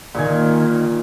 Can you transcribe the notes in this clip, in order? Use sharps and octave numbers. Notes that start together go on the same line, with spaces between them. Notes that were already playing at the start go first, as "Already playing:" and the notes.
A#2 D#3 G#5